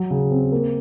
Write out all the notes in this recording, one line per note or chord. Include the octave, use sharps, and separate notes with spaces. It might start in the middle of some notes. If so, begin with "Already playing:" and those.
Already playing: F#3
C#3
C4
A#3